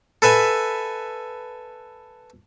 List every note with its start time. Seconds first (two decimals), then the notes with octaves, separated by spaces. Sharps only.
0.22 A4 B4 E5 G#5